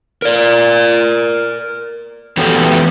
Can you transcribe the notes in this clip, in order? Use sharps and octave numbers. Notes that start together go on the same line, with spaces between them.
A#4 D5
E3 F#3 B3 C#4 G4 A4